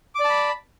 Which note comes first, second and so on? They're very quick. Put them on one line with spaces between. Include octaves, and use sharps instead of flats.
D6 D5 A5 B5